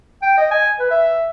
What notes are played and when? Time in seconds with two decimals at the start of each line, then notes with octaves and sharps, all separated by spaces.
0.22 G5
0.37 D#5
0.51 G#5
0.79 B4
0.91 E5